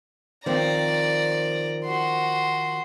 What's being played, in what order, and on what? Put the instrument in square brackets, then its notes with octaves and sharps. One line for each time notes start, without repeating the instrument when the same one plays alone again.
[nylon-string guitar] D#3 F3 C4 [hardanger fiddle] D5 A#5
[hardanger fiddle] F#4 C6